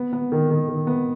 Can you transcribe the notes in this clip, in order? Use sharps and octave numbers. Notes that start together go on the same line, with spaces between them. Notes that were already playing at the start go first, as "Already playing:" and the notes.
Already playing: B3
B3
D#3
D#3
D#3
B3